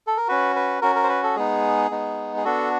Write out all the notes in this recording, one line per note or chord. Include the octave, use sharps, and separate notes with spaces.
A4
A#4
C#4 F#4 B4
B4
C#4 F#4 A#4
A#4
C5
B4
A4
G#3 B3 D#4 G#4
G#3 B3 D#4
G#4
B3 D4 F#4 A4